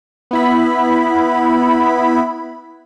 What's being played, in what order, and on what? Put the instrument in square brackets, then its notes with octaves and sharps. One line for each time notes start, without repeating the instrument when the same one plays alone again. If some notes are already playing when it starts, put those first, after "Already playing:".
[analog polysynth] B3 E4 B5